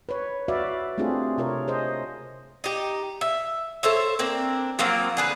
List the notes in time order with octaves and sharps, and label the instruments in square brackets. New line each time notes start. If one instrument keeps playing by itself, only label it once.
[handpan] B4 C#5
F#4 B4 D5 E5 F5
A3 C4 D4 F4 G4 G#4
C3 F4 A#4 C#5
G#4 C5 D#5
[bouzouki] D#4 G4
E5
A4 C5 C#5 E5
A#3 C4 D4
F3 F#3 A#3 C4
D3 G#4 B4